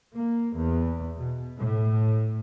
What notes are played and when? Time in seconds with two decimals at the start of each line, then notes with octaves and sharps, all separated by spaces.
0.16 A#3
0.58 E2
1.17 B2
1.58 A2